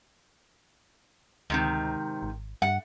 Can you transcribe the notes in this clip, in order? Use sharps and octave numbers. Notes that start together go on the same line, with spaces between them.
D2 G#2 C3 D#3
G#1
G2 F#5